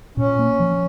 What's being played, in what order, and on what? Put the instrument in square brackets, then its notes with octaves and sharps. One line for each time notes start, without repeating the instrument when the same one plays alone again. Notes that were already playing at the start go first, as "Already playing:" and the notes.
[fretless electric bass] A#2 [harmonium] C#4
[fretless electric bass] A#3
F3